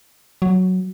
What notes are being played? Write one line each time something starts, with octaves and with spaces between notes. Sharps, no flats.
F#3